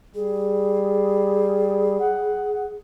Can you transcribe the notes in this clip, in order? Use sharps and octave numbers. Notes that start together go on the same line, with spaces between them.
G3 G#4
F#5